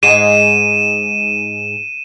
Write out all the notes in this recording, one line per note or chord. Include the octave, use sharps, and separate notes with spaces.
G#2 G#3 D#7 E7